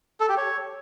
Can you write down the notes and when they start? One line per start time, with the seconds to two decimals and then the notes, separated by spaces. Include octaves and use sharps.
0.20 A4
0.29 G4
0.37 C#5